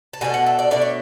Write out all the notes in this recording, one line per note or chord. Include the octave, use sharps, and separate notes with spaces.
A5
B2 A3 D4 G#5
F#5
E5
D5
B2 A3 D4 D5
C#5